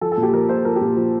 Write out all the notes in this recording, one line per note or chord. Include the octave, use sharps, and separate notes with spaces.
F3 A4
A4
A#2
G4
F3 A#4
A#2 C5
F3 A#4
G4
A#2
F3